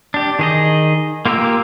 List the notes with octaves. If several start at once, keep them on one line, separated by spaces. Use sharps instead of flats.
D4 G4
D#3 G#4 D#5
A#3 F4 G4 A#4 E6